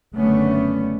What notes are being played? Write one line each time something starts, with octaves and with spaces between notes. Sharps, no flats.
F#1 D3 A3 B3 C#4